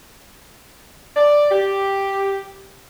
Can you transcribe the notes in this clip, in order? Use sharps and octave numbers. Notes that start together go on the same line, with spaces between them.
D5
G4